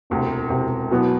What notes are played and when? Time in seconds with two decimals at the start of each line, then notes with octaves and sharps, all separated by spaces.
0.10 E1 D2 C3
0.50 E1 D2 C3
0.91 E2 B2 F#3 B3